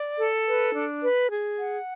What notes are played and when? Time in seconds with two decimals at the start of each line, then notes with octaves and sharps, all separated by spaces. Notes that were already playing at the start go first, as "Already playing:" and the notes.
Already playing: D5
0.17 A4
0.46 B4
0.74 D4
1.01 B4
1.30 G#4
1.59 F#5